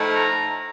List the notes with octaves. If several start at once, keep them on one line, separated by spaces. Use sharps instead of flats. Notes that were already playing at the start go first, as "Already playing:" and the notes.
Already playing: A2 F3 A3 D#4
A#5